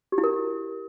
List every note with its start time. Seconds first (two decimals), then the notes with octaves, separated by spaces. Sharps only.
0.12 G4
0.18 E4
0.24 A#4